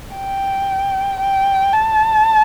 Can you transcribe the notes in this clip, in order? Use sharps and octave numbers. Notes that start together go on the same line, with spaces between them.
G5
G5
A5